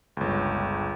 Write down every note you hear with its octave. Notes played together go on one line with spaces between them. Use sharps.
G1 C#2